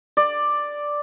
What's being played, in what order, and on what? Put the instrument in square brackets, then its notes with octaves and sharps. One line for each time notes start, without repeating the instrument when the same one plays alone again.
[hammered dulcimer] D5